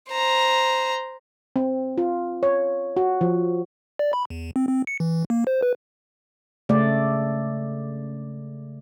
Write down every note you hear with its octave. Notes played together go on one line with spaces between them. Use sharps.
C5 A#5
C4
F4
C#5
F#4
F3
D5
B5
E2
C4
C4
C#7
E3
A#3
C5
B4
C#3 A3 D5